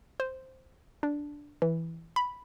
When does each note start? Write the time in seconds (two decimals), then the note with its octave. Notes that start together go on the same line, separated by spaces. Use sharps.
0.20 C5
1.03 D4
1.62 E3
2.16 B5